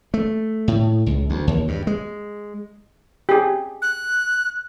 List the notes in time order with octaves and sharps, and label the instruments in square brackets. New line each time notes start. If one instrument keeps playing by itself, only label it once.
[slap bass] A3
A2
C#2
D2
D#2
G2
G#3
[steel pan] G4 G#4
[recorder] F#6